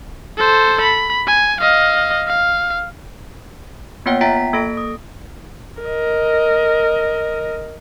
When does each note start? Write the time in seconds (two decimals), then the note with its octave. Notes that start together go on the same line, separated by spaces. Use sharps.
0.38 A4 C5
0.82 B5
1.27 G#5
1.61 D#5 F5
2.27 F5
4.06 A#3 B3 F4 C#5 F#5 G5
4.21 F4 E5 G5 A#5 A6 B6
4.37 B6
4.53 A#3 A4 A#6 D7
4.77 D#6
5.81 A#4 D#5